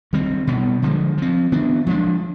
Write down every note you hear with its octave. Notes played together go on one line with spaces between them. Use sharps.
D#3 G3 C4
B2 G3 B3
D3 F3 G#3
F3 C4
D#3 B3 D4
F3 G#3 D4